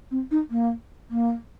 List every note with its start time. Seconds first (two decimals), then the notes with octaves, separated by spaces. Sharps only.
0.11 C4
0.31 D#4
0.51 A#3
1.10 A#3